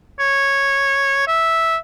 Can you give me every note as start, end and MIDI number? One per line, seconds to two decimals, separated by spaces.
0.20 1.25 73
1.27 1.77 76